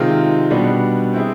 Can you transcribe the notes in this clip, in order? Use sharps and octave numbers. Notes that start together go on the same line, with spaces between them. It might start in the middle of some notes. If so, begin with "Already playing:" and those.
Already playing: C3 D#3 G#3 C4 F4
B2 G3 B3 D4 F#4
C4 E4 G#4